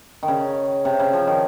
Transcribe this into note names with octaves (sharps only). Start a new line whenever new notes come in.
D#3
C#3
C3
C#3
F3
D#3